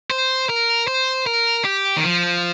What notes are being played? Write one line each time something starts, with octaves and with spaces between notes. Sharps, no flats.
C5
A#4
C5
A#4
G4
D#3
F3